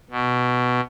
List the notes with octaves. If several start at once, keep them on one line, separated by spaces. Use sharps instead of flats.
B2